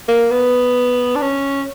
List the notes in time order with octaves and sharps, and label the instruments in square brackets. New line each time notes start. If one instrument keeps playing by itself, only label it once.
[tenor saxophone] A#3
B3
D4
C#4